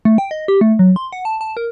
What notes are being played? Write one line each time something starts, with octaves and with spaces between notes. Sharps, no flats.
A3
G5
D#5
G4
A3
F#3
C6
F#5
A5
A5
A#4